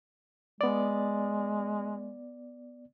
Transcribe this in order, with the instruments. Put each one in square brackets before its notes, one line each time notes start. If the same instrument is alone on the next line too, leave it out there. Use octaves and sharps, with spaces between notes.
[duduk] G#3 [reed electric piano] B3 D5